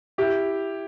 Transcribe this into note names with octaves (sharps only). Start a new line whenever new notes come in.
E4 G4